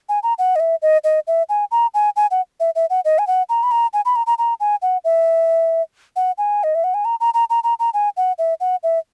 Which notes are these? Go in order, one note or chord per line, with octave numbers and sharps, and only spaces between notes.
G#5
A#5
F#5
D#5
E5
D#5
D#5
E5
G#5
A#5
G#5
G#5
F#5
E5
E5
F#5
D#5
G#5
F#5
A#5
B5
A#5
G#5
B5
A#5
A#5
A#5
G#5
F#5
E5
F#5
G#5
D#5
E5
F#5
G#5
A#5
A#5
A#5
A#5
A#5
A#5
G#5
F#5
E5
F#5
E5